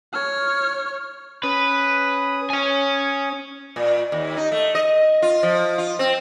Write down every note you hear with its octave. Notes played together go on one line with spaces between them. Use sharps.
C#5 F6
C#4 B4 D#6
C#5 G#5
A#2
D#2
D#4
A3
D#5
F4
F3
F4
C4